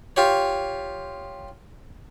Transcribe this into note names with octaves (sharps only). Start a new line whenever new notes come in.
F4 G4 C#5